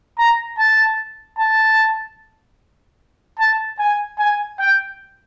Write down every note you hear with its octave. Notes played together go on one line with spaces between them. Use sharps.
A#5
A5
A5
A5
G#5
G#5
G5